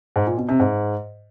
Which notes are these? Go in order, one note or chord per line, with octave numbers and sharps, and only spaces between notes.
G#2
A#2
B2
C3
G#2